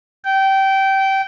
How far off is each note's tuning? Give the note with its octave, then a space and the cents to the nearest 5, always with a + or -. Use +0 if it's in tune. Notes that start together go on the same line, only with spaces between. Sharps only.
G5 -20